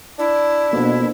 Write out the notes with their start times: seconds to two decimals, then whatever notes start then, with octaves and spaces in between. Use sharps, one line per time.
0.19 D4 E4
0.73 F2 B2 A#3 D4